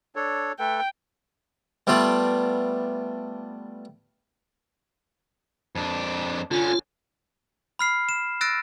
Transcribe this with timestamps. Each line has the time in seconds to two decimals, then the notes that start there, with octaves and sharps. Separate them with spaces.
0.16 D4 A4 C#5
0.59 A3 A4 B4 G5
1.87 G3 A3 B3 F4 D5
5.75 F2 D4
6.51 D3 C#4 F4
7.79 B5 F6 C7
8.09 E7
8.41 E6 F#6 A6 A#6 D7